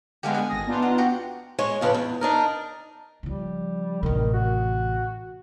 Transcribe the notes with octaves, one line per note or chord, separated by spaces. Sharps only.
D3 G#3 B3 G4 F5 G#5
G#5
G#1 D#6 A#6
B3 D4 D#4 F4
F#5
F#4 G4
G#3 C#5
F2 C#3 D4 G#4 B4
E2
D4 D#4 A#4
C#3 F3 G3
A1 C3 D#3
F#4